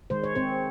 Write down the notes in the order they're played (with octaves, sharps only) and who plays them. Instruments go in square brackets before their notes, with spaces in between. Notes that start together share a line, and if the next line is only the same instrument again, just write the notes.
[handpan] D#3 G#3 C5
C#5
C4 C5